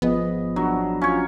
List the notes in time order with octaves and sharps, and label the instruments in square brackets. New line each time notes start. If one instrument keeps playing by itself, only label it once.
[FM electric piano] G#1 G#4 B5 [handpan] F3 D#5 [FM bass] B3
[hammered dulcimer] F#3 [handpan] D4
[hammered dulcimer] C#4 C#5 [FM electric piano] F4